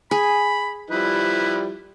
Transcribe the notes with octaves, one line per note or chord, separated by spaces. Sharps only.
G#4 B5
F3 G3 E4 B4